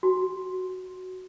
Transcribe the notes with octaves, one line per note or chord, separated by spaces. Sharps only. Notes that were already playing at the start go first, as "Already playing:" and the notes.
F#4